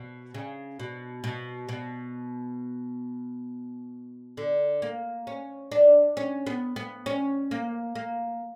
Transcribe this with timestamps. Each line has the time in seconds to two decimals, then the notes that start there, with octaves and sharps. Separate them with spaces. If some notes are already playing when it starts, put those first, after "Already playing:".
Already playing: B2
0.34 C#3
0.80 B2
1.24 B2
1.69 B2
4.37 D3
4.82 A#3
5.27 C#4
5.72 D4
6.17 C#4
6.47 B3
6.76 B3
7.06 C#4
7.51 A#3
7.95 A#3